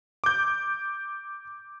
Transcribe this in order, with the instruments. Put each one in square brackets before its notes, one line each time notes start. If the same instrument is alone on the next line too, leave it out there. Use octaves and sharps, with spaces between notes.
[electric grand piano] D6 G6